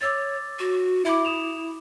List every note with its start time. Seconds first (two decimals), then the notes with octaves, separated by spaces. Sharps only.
0.01 C#5 D6 E6 A6
0.59 F#4
1.05 E4 E5 D6
1.25 D#6 E7 F7